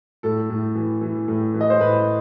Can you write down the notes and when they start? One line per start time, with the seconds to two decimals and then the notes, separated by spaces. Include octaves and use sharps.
0.23 A2 A4
0.50 A2
0.75 E3
1.01 E3
1.28 A2
1.54 E3
1.61 D#5
1.70 C5
1.80 A2 B4